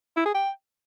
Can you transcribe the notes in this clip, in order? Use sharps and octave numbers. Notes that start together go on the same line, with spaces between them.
E4
G#4
G5